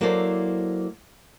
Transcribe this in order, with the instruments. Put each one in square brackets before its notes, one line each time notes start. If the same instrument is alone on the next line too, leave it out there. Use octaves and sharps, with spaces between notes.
[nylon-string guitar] F#3 A#3 E4 A4 C5 D5